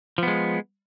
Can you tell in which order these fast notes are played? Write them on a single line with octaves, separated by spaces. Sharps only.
F3 B3 G#3